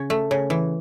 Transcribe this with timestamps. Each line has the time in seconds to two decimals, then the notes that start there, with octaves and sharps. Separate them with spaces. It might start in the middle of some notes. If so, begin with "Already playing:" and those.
Already playing: C#3 C#5
0.10 A3
0.31 C#3
0.50 E3